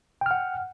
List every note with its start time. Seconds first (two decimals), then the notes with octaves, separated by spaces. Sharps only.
0.21 G5
0.26 F6
0.31 F#5